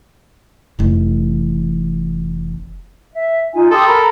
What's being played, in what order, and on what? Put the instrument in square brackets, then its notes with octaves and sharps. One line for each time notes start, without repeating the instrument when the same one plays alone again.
[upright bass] F1 E3
[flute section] E5
D#4 F4 G#5
[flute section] G4 C6 D#6 [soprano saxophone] A4
[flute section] A#4 A#5 B5